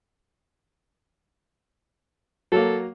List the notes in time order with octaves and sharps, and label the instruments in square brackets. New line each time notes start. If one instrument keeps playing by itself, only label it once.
[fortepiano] F#3 A#3 [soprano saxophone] A4